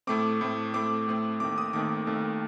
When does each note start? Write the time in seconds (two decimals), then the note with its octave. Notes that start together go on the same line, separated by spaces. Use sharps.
0.07 A2 A3 C4 D6
0.41 A2 A3 C4
0.74 A2 A3 C4 D6
1.08 A2 A3 C4
1.40 D#2 D#3 A3 C4 D6
1.58 D#6
1.73 D#2 D#3 A3 C4 D6
2.07 D#2 D#3 A3 C4